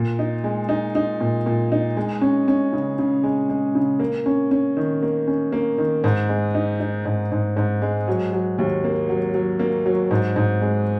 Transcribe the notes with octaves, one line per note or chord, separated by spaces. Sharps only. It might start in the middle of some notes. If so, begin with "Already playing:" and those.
Already playing: A#2
D#4
G#3
D#4
D#4
A#2
A#2
D#4
G#3
C#4
C#4
C#3
C#3
G#3
G#3
C#3
A#3
C#4
C#4
D#3
A#3
C#4
A#3
D#3
G#2
G#3
D#4
D#4
G#2
G#2
G#2
G#3
F#3
F#3
D#2
A#3
F#3
F#3
A#3
F#3
G#2
G#2
G#3